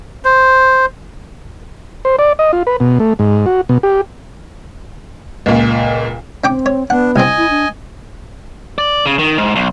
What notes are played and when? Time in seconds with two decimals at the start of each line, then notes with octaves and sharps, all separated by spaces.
0.25 C5
2.05 C5
2.19 D5
2.39 D#5
2.53 F4
2.67 B4
2.80 B2
3.00 A3
3.19 G#2
3.46 F#4
3.69 B2
3.83 G4
5.46 C#2 A#2
6.44 C4 C#4 G5 D6
6.66 C#5
6.90 B3 D4 F#5
7.16 C2 C4 D#5 G#5
7.38 E4
7.50 D4
8.78 D5
9.06 C#3
9.19 D#3
9.38 G#2
9.56 B1